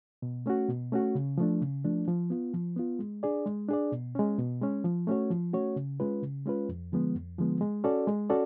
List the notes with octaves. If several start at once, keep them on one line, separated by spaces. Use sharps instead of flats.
B2
A3 C#4 F#4
B2
A3 C#4 F#4
C#3
F3 A3 D4
C#3
F3 A3 D4
F3
B3 F4
F3
B3 F4
G#3
D4 G#4 D5
G#3
D4 G#4 D5
B2
G#3 C#4
B2
G#3 C#4
F3
A3 C#4 F#4 C#5
F3
A3 C#4 F#4 C#5
C#3
G#3 C#4 F4 B4
C#3
G#3 C#4 F4 B4
F2
D3 F3 G#3 B3
F2
D3 F3 G#3 B3
G#3
C#4 F#4 A4 D5
G#3
C#4 F#4 A4 D5